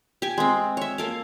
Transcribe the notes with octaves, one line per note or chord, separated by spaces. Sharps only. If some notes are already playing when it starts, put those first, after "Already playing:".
G4 G#5
G#3 C4
C#5 E5
A#3 A4 F5